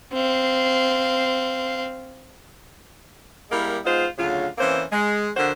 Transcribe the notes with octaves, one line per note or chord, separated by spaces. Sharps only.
C4 F5
G3 G#3 A#3 E4 A#4
G#3 B3 D#4 F4 C5
D2 C#3 F#3 F4
E3 A#3 C4 C#4 C5
G#3
D3 F3 F#4 A#4 C5